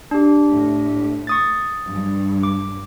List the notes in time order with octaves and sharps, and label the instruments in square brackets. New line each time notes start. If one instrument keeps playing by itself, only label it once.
[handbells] D4 G4
[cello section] A2
[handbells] C#6 D#6 A6
[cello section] G2
[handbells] D6